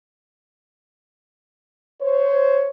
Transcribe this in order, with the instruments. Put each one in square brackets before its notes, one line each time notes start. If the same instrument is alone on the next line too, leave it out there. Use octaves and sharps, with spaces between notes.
[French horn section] C5 C#5